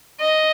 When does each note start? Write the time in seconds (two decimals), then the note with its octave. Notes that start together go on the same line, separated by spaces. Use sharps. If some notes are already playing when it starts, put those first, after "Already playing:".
0.21 D#5